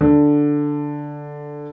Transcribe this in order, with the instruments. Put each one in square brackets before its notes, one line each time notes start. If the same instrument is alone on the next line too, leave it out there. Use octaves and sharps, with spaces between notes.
[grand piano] D3